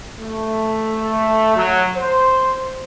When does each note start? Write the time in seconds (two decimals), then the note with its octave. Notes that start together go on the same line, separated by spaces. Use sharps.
0.20 A3
1.56 F#3
1.96 C5